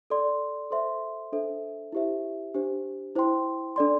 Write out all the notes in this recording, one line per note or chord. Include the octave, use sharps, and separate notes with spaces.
A4 D5 C6
A4 C5 E5 C6
D4 A4 C5 E5
E4 G4 C5 E5
D4 G4 C5
E4 C5 G5 C6
D4 A4 D5 C6